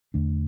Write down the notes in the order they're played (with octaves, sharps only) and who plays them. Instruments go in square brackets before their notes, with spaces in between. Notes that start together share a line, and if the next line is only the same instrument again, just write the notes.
[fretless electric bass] E2 D3 A3 D4